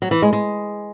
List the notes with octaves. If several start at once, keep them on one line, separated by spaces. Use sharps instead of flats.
F#3
E3
G#3
G#3